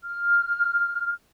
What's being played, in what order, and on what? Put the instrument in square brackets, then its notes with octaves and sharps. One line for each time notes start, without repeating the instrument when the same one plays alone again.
[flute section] F6